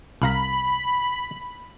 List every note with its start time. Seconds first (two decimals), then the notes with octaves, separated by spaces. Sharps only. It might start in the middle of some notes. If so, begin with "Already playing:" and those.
0.22 C2 F5 A#5 B5